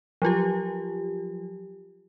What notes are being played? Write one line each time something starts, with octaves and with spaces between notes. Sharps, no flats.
F3 F#3 F4 G4